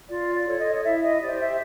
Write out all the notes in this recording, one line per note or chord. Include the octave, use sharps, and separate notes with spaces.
F4 D5
D5
A4 C#5
D#5
D#5
E4 E5
D#5
G4 C5 D5
E5